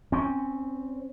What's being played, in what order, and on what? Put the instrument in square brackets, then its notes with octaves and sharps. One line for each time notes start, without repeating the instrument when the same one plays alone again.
[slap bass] C4 C#4